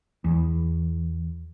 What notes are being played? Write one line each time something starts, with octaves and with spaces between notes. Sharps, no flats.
E2